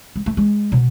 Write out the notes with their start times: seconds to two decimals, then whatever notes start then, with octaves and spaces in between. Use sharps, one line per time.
0.16 G#3
0.26 A3
0.37 G#3
0.72 B2